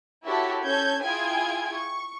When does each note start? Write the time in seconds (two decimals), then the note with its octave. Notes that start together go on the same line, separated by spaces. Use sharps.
0.25 E4 F#4 G4 A4 C#5 E5
0.63 C#4 A4 G6 G#6
1.03 E4 F4 G#4 G5 G#5 G#6
1.74 C#6